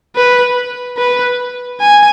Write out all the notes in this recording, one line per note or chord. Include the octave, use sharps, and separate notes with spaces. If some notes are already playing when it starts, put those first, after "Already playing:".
B4
B4
G#5